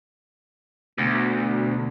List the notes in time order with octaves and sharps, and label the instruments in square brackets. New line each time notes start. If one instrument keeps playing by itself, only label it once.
[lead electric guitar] D2 [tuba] B2